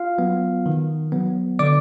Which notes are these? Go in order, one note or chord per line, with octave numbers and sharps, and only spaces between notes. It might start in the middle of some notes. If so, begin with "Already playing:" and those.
Already playing: F4 F5
F#3 B3
D#3
F#3 B3
D3 D5 D6